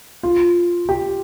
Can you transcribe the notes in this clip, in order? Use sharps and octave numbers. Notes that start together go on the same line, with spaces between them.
F4
G4